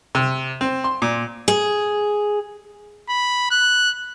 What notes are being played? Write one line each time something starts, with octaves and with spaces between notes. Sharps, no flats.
C3
C4
C6
A#2
G#4
B5
F#6